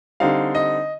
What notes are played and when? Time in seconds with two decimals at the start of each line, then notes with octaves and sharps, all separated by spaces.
0.20 D3 G3 C4 D#4 F5
0.55 D#5